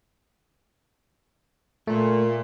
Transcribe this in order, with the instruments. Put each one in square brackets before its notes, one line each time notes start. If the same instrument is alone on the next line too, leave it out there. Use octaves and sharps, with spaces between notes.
[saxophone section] A#2 [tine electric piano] A3